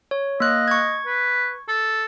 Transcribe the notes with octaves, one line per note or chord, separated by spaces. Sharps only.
C#5
A#3 D#5 F#6
C#6 G#6
B4
A4